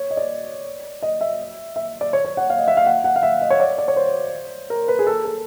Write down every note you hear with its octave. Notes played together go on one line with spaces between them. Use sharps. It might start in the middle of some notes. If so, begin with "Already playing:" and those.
Already playing: C#5
D#5
D5
D#5
E5
E5
D5
C#5
C#5
F#5
F5
D#5
E5
F5
F#5
F#5
F5
E5
D#5
C#5
D5
D5
C#5
C5
A#4
B4
G#4
A4
A4